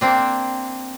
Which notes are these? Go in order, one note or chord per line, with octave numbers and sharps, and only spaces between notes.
A#3 C4 D4